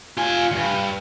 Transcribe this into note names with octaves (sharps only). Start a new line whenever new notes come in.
F4 G#5
D2 G2